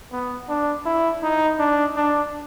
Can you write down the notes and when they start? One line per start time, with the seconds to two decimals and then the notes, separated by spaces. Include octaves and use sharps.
0.12 B3
0.49 D4
0.86 E4
1.23 D#4
1.59 D4
1.96 D4